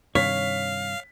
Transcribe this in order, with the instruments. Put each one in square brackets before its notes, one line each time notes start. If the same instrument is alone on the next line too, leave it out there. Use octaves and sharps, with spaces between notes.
[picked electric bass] G2 C3 D#3 [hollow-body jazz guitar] C#5 [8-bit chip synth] F5 [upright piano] B6